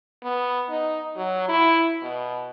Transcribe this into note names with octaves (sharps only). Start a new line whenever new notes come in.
B3
D#4
F#3
E4
B2